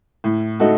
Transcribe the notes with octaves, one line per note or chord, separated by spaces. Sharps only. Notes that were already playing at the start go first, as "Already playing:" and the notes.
A2
A3 D#4 F#4 A4